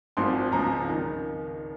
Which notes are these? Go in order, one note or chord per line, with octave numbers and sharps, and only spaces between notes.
G#1 G#2 F3 C4 C6
C#2 C#3 F3 C4 A#5
D#3